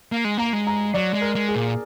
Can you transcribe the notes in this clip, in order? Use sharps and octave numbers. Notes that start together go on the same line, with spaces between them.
A#3
G#3
A#3 A#5
G#3
A#5
F#3 D5
G#3
A#4
G#3
G#4
A#2